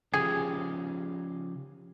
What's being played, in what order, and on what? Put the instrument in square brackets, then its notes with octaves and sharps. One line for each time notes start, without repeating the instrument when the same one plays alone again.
[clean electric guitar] C#3 F3 G4 [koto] G#4